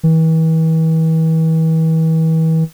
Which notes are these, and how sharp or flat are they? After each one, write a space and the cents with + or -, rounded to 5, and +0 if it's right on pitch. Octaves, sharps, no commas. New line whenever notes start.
E3 -40